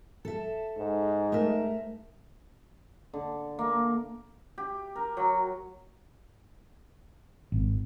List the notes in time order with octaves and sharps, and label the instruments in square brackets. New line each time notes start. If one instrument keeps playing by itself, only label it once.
[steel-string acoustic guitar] A4 E5
[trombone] G#2
[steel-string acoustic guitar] A3 A#4 E5
[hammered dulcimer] D3
A#3
G4
A#4
F#3
[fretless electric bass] G#1